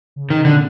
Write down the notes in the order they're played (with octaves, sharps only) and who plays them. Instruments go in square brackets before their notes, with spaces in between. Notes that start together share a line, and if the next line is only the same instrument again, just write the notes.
[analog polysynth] C#3
[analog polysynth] C3 [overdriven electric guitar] D#3
[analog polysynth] A#2 [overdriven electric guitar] D3